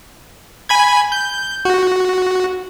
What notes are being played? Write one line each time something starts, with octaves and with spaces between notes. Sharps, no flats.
G#5 B5 G#6
G6
F#4